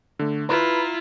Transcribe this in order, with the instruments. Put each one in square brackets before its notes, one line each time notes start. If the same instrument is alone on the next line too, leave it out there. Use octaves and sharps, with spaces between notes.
[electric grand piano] D3 A3
[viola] E4 F4 [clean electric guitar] B4 [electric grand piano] A#5